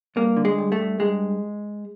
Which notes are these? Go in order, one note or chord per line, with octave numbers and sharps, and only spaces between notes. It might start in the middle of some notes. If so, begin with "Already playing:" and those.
G2 A#3
D3
G#3
G2
A3
G2
G2 G#3